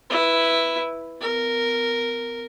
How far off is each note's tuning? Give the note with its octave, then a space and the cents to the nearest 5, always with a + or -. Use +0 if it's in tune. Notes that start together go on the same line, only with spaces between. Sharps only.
E4 +0 B4 +0
B3 +35 A#4 -5